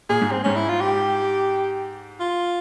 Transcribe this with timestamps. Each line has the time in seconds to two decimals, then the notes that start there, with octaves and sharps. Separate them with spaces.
0.09 A#2 G#4
0.21 G#2
0.31 C4
0.44 G#2 C#4
0.56 E4
0.69 F4
0.81 G4
2.20 F4